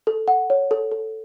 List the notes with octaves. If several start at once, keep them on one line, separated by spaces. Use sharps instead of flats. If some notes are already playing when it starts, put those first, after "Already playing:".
A4
F#5
C#5
A4
A4